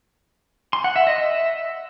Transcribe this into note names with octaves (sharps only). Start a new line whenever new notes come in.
C6
F#5
E5
D#5
E5